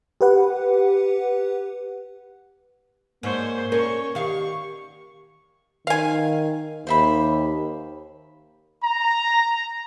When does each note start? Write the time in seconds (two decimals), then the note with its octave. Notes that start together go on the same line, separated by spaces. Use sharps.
0.21 G4 B4 F#5
3.23 G#2 A#3 C5 C#5
3.72 C#4 A#4 C#5 C#6
4.15 D#3 G4 F5 C#6
5.87 D#3 F5 G#5
6.87 D#2 C5 E5 B5
8.83 A#5